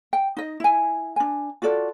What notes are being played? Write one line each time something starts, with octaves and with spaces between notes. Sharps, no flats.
G5
D#4 D#5
E4 G#5
D4 G#5
F4 F#4 A4 D5